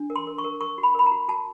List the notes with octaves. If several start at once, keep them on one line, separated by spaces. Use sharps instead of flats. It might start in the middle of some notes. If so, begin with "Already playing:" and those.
Already playing: D4
A#4
C6
A#4
C#6
A#4
A#4 C#6
F#4
B5
A#4 B5
A#5
F#4
F#4 A5